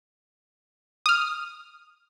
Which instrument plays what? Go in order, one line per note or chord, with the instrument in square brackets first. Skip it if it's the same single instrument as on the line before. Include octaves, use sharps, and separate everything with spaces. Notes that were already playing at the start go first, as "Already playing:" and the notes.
[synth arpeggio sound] D#6 F6